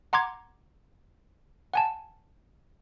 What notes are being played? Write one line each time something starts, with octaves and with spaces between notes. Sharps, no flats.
F#5 A#5 C6 D6 G#6
F#5 G#5 A5